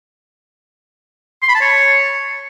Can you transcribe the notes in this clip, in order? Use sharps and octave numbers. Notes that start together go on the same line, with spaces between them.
C6
B5
A5
C#5